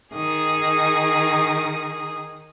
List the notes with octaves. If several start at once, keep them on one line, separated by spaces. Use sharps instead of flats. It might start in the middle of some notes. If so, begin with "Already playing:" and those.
D#3 G#4 D#6